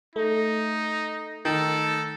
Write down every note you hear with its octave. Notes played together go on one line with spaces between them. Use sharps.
A3 D#4
D#3 A4